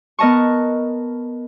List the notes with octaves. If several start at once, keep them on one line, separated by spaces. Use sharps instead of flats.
B3 A#4 D#5 A5 C#6